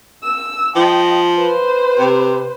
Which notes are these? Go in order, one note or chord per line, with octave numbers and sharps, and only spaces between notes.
E6
F3 D#5 G5
B4 C5
C3